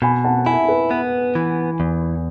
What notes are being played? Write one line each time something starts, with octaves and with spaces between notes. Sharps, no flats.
B2 G#5 B5
F#5 A5
E4 E5 G#5
B4
B3
E3
E2